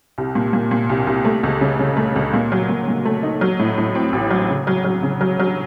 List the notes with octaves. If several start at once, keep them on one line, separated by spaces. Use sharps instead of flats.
C2
A#2
A#2
A#2
C2
C2
A3
C#2
C#3
C#3
A3
C#2
A#2
F#3
A#2
A#2
A3
D#4
F#3
A2
A2
C4
A1
F#3
C#3
F#3
F#3
C#3
F#3
F#3